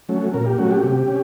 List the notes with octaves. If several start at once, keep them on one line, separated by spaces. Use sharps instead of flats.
F#3 A3 C#4
A#2 A#4
G4
F#3 A3 C#4 F#4
G4
C3
C#4